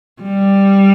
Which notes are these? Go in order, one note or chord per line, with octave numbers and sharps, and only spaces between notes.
G3